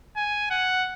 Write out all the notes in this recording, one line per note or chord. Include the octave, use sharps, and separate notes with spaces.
G#5
F#5